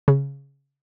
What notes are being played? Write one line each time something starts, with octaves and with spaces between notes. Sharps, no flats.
C#3